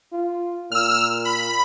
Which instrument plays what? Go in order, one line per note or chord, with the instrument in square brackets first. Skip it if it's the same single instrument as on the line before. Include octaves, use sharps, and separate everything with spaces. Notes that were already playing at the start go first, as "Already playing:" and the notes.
[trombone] F4
[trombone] A#2 [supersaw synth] E6 F6
[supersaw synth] B5